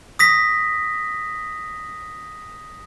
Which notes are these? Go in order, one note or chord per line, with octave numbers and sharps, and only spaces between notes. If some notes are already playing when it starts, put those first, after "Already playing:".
D#6 A#6 B6